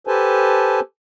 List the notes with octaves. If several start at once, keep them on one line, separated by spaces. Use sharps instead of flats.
G4 A4 B4 C5 G#5 A5